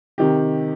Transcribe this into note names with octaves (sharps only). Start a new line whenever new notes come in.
C3 D#3 G4